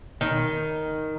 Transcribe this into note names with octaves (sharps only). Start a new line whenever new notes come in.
D#3